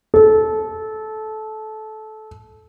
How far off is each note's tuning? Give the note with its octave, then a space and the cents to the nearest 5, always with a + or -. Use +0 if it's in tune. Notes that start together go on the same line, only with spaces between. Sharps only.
A4 -20